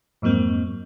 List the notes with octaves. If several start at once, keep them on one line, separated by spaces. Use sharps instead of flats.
F2 G#2 F#3 A#3 C4